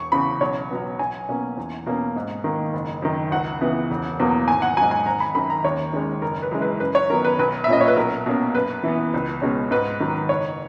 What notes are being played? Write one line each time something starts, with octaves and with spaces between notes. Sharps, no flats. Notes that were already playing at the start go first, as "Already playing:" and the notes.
Already playing: E1 C#6
E2 C#3 B5
B1 C#5
B2 F#3 B3
B1 G#5
B2 A#3 C#4
E2
B2 A#3 C#4
G#2
D#3 A#3
F#1
F#2 D#3
C#2 F#5
C#3 E3 B3
E1
E2 B2 F#3 A#3
G#1 G#5
F#5
G#2 F#3 G#5
G#5
G#1 A#5
B5
F#2 D#3 B5
A#5
D#2 C#5
D#3 G#3 C#4
F#1 A#4
B4
F#2 E3 G#3
B4
F#2 B4
C#5
D#3 F#3 B3 A#4
B4
B1 B4
E5
A#2 A#3 C#4 D#5
C#5
B4
B1 A#4
B2 A#3 C#4
F#2 B4
E3 B3
C#2
B2 G#3 C#4
G#2 B4
D#3 F#3
F#1 C#5